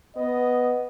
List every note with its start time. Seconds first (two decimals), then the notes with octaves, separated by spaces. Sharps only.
0.17 B3 D#5